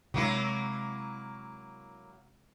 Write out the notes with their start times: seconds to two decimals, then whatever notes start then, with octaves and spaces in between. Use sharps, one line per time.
0.14 C3 F#3 G#3 A#3 E4